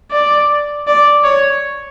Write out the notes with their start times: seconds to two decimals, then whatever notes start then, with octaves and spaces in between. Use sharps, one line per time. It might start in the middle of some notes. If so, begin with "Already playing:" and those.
0.11 D5
0.88 D5
1.24 C#5